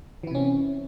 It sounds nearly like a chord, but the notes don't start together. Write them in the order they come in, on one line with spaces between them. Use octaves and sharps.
E3 E4 C3 C#4 C4